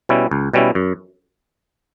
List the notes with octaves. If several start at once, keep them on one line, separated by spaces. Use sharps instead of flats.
B2 G3 C#4 E4
C#2
B2 G3 C#4 E4
F#2